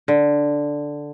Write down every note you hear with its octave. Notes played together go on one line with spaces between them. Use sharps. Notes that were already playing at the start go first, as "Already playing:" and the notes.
D3